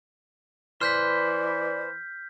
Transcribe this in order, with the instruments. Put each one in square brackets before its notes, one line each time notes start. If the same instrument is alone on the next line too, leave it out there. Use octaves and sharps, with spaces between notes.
[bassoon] E3 [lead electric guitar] B4 C5 [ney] D5 [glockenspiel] F6 G6 B6